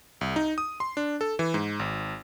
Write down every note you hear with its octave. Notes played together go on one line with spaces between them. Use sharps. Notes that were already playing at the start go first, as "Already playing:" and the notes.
C2
D#4
D#6
C6
D4
A4
E3
G#2
G#1